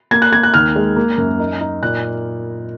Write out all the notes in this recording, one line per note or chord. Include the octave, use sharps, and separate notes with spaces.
A#3 G#6
F#6
A#3 G#6
F#6
D#2 F6
G#3
A#3
F#2
D#4
D#4
A#2 F#6